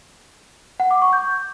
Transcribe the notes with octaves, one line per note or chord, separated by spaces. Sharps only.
F#5
D6
C#6
G6